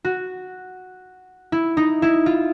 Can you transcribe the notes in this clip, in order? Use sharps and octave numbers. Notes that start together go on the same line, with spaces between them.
F#4
E4
D#4
E4
F4